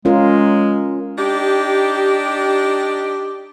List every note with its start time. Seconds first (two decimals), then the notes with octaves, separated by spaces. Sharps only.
0.05 G#3 C#4 F4 A#4
1.17 D4 D#4 G4